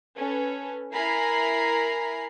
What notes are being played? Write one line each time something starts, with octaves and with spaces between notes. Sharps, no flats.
C#4 A4 B4
E4 A#4 G#5 A#5 B5 C7